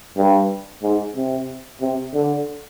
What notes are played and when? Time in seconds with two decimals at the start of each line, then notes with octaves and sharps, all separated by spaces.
0.17 G2
0.82 G#2
1.16 C3
1.81 C3
2.14 D3